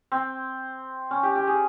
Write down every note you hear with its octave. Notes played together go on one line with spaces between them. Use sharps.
C4
C#4
G4
G4
G#4